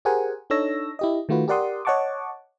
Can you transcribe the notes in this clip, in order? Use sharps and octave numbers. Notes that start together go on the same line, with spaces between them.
G4 G#4 A#4 C5 F#5 G#5
D4 D#4 A4 C#5 E6 A#6
E4 G4 D#5
D#3 A3 F4 F#4 B4
G4 A#4 D5 F#5 C6 D#6
C#5 D#5 F#5 A5 C#6 D6